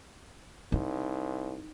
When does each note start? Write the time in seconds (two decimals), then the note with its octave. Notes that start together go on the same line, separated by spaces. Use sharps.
0.72 C2 D#4